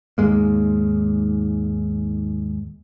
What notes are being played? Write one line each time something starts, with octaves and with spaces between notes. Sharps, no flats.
D#2 G#2 G#3 A#3